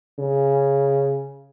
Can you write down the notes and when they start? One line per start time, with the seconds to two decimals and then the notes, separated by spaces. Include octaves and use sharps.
0.19 C#3